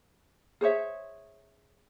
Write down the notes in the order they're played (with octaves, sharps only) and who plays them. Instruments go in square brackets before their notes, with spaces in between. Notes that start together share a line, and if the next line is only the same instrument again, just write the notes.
[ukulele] G#4 C5 C#5 E5